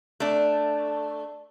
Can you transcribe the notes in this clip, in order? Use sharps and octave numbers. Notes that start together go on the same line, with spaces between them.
A3 D4